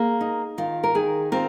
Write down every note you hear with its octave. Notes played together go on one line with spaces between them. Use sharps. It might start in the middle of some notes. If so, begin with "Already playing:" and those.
Already playing: A#3 G#4
D#4
D#3 F4
A#4
D#3 G#4
C4 F4 A#4